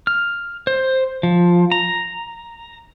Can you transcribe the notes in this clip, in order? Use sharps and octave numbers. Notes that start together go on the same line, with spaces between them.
F6
C5
F3
A#5